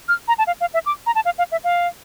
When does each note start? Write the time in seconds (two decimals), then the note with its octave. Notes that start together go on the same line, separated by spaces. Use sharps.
0.08 F6
0.28 A#5
0.38 A5
0.47 F5
0.61 F5
0.74 E5
0.86 D6
1.06 A#5
1.15 A5
1.25 F5
1.38 F5
1.52 E5
1.64 F5